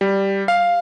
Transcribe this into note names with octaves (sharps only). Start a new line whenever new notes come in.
G3
F5